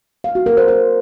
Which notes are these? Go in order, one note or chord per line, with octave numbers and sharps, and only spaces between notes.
F5
F#4
A#4
C5
C5